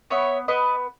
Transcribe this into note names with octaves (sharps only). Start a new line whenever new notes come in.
B3 C#5 E5
B3 B4 D#5